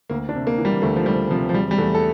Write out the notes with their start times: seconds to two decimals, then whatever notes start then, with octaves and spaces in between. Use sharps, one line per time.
0.10 D2 A#3
0.29 D4
0.35 C3
0.47 A#3
0.58 E3
0.65 G3
0.82 D2 A3
0.96 F3
1.06 D2 G3
1.31 C3 F3
1.49 F3
1.54 E1 G3
1.71 G3
1.78 E2 A3
1.95 A4